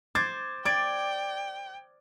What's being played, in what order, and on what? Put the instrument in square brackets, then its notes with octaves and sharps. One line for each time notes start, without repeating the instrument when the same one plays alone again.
[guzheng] C5 [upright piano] D6 G#6 A6
[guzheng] D5 [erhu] G5 [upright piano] G#6 D7